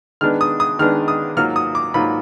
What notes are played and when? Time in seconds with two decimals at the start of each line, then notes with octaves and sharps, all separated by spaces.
0.21 D#3 G#3 B3 D4 F6
0.41 D#6
0.60 D#6
0.79 D#3 G#3 B3 D4 F6
1.08 D#6
1.36 G#2 F#3 A#3 F4 F6
1.56 D#6
1.75 D6
1.94 G#2 F#3 A#3 F4 B5